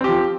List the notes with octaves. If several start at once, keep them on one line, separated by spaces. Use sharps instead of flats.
F3 C4 G4